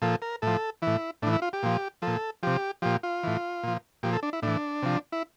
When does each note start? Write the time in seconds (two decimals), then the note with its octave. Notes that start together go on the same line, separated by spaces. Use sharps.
0.02 A#2 F3 A4
0.22 A#4
0.42 A2 F3 A4
0.82 A2 E3 E4
1.22 A2 D4
1.27 E3
1.33 E4
1.42 F4
1.53 G4
1.63 A#2 F3
2.02 F3 A4
2.07 A#2
2.43 C3 F3 G4
2.82 A#2 F3 G4
3.03 F4
3.23 A2 E3
3.63 A#2 F3
4.03 A#2 F3 G4
4.13 A4
4.23 D4
4.33 E4
4.42 A2 E3 D4
4.82 C3 F3
5.12 E4